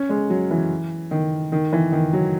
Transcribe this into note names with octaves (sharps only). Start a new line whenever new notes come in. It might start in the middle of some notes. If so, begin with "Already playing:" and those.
Already playing: C#4
G#3
F#3
E3
D#3
D#3
E3
D#3
F#3